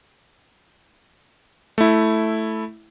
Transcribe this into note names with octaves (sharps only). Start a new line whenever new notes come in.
A3 E4